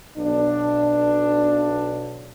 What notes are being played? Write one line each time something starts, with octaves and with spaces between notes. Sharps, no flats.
B1 D4